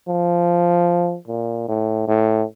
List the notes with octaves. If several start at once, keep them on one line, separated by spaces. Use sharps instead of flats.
F3
A#2
A2
A2